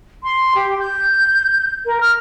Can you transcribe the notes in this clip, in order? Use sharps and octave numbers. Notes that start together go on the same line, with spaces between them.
C6
G4
G6
A#4
F6